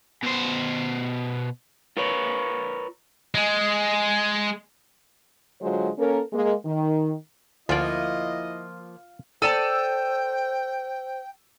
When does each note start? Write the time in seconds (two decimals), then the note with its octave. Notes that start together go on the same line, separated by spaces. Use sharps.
0.23 B2 C5
1.97 F4 A#4 B4 C#5
3.35 G#3
5.62 D3 F#3 G#3 F4 C5
5.99 A#3 C#4 A4 A#4
6.33 G#3 A#3
6.65 D#3
7.69 D2 F3 A#3 E4 F4 D5 D#5
9.42 A4 C5 D5 G5 A5 E6 D#7 E7